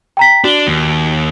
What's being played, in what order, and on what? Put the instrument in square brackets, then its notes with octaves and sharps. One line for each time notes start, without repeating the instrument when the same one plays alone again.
[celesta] G5 A#5 B6
[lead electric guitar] D4 [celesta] F#4 G7
[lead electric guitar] D#2